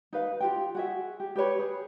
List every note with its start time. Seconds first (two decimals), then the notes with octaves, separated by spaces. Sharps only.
0.13 D#4 B4 F5
0.40 F4 G4 G5
0.75 F#4 G#4 E5
1.20 G4
1.36 G4 B4 C#5 B5
1.59 G#4